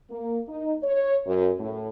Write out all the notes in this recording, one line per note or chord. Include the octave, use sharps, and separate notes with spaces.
A#3
D#4
C#5
F#2
A2